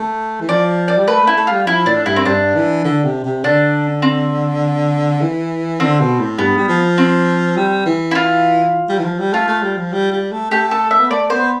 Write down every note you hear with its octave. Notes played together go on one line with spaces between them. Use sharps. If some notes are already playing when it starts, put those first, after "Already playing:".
Already playing: A3
E3
F3 D5
D5
G3
A3 B4
A3 E4
A3
G3 F4
F3 E4
A2 D4
G2 E4
C4
G2 D4
E3
D3
C3
C3
D3 D4
C4
E3
D3 C4
B2
A2
G2 B3
G3
F3
C4
G3
E3
E4
F4
G3
E3
F3
G3
A3 F4
A3
G3
F3
G3
G3
A3
A3 G4
A4
E5
B3
A3 D5
B3 C5